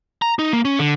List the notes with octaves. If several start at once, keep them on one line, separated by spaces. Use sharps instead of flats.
A#5
D#4
A#3
C#4
D3